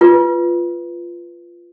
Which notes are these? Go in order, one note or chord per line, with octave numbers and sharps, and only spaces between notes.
F4 B4